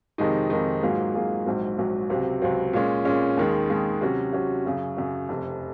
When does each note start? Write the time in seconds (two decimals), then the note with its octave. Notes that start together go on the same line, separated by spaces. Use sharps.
0.18 F2 C3 D#3 G#3 D#4
0.50 F2 C3 D#3 G#3 D#4
0.82 G#2 F#3 A#3 F4 G#4
1.14 G#2 F#3 A#3 F4 G#4
1.46 A#1 G#2 F#3
1.78 A#1 G#2 F#3
2.10 C#2 C3 F#3 C4
2.42 C#2 C3 F#3 C4
2.73 A#2 G#3 C#4
3.05 A#2 G#3 C#4
3.37 D#2 D#3 G#3
3.70 D#2 D#3 G#3
4.01 C3 F#3 C#4 F#4
4.33 C3 F#3 C#4 F#4
4.66 F#2 C#3 F#3
4.97 F#2 C#3 F#3
5.29 F1 F2 C3